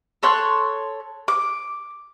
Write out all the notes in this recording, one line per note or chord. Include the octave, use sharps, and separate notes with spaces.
A4 C#5 C6 F#6
D6